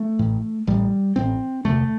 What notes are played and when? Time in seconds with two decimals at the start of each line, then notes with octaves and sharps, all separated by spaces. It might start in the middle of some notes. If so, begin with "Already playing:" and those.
Already playing: A3
0.19 A1 A2
0.67 A1 A2 G3
1.16 A1 A2 C4
1.65 E1 D2 C3 A3